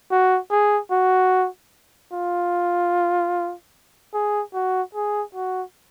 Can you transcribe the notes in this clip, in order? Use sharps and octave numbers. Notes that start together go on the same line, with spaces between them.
F#4
G#4
F#4
F4
G#4
F#4
G#4
F#4